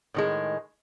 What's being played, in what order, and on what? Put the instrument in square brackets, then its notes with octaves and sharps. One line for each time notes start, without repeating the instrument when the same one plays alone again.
[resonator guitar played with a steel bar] A2 D#3 G#3